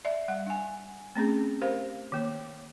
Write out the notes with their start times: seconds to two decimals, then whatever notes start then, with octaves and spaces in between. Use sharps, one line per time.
0.05 D5 E5
0.28 G3 F#5
0.47 D4 G#5
1.15 A3 C4 C#4 G#4
1.62 G4 A#4 C5 F5
2.12 D#3 A#3 C#5